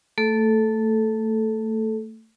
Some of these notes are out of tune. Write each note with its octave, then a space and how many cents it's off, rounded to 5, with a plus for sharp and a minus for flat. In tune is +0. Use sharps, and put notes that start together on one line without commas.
A3 +20 A4 -15